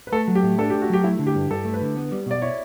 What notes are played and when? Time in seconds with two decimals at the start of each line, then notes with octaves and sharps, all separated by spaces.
0.07 B4
0.12 A3 A4
0.28 F#3
0.35 G4
0.43 A2
0.58 D4 A4
0.70 G4
0.73 A3
0.82 F#4
0.90 F#3 G4
1.04 A3 E4
1.19 D3
1.27 G4
1.35 G2
1.50 G2 A4
1.65 A3
1.74 B4
1.81 D3
1.97 B3
2.12 G3
2.26 B2 D5
2.42 E4 C#5